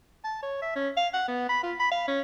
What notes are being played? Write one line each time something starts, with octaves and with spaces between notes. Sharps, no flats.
A5
C#5
E5
C#4
F5
F#5
B3
B5
F4
B5
F5
C#4